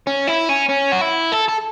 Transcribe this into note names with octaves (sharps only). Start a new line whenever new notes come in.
C#4
E4
C#4
C#4
F#4
E4
A4
A4